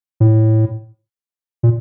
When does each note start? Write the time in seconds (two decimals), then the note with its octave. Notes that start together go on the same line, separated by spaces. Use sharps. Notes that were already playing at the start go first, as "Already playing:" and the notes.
0.20 A2
1.63 A#2